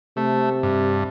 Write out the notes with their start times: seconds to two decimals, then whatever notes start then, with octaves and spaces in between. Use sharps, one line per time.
0.17 C3 A3
0.63 G2